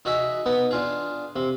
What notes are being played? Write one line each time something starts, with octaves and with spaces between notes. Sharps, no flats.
D#4 F#4 G#4 E5
B3 D#4
D4 F4 G#4
C3